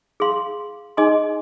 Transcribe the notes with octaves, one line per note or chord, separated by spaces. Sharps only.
G#4 F5 C6
D#4 G#4 D#5 G#5 C6